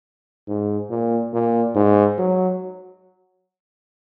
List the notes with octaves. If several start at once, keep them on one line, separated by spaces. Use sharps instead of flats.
G#2
A#2
A#2
G#2
F#3